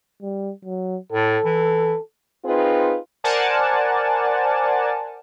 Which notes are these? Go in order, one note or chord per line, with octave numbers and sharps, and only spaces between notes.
G3
F#3
A2 A4
E3
C4 D#4 F4 G#4 B4
A#4 C5 D5 F#5 G#5 A5